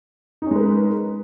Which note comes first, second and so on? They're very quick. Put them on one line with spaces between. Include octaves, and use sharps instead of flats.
D#4 C#4 G#3 B4 A#4